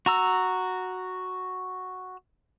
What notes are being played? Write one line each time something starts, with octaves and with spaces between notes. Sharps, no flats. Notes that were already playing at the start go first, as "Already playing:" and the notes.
F#4 A#5 E6